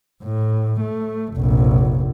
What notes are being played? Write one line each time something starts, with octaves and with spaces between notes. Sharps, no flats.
A2
A3
F1 A#1